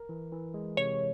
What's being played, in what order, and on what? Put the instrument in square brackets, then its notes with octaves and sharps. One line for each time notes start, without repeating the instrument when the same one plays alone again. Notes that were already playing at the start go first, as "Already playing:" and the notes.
Already playing: [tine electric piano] A#4
E3
E3
G#3
[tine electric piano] C3 [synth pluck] C#5